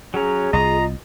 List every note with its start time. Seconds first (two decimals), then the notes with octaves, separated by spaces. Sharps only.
0.14 F#3 C#4 G#4 A#5
0.53 C2 F4 D#5 A#5